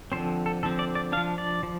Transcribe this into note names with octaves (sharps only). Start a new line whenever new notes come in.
D3 F3 C4 C5
A4
D3 F3 C4 A4
D5
D5
F3 D4 F5
D5
F3